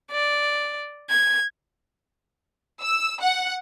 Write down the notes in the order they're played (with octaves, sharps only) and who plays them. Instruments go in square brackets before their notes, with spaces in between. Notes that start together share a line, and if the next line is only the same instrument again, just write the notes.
[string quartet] D5
G#6
[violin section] E6
F#5